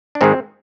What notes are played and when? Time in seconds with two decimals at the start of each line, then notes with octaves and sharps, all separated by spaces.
0.15 D4
0.21 G#2 D#3 G#3 C4